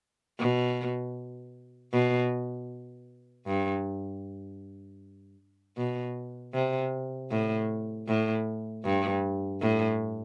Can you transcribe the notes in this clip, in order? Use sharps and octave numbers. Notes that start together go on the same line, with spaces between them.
B2
B2
G2
B2
C3
A2
A2
G2
A2